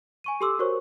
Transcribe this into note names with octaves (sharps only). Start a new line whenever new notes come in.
G#5 C#6 D#7
G4 A4 C6 D6 E6
F#4 A#4 C5 C#5 C#6